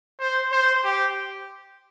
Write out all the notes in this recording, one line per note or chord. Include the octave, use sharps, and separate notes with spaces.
C5
C5
G4